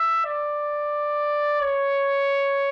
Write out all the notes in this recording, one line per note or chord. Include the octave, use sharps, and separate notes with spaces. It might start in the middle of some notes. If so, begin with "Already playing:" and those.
Already playing: E5
D5
C#5